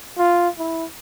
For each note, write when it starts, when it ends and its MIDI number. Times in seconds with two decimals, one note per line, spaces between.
0.18 0.48 65
0.58 0.84 64